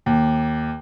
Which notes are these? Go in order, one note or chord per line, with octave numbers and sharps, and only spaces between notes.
D#2